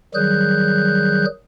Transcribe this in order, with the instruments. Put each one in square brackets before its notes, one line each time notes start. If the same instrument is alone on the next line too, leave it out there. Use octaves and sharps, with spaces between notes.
[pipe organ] D#3 F#3 G3 G#4 F#6 G6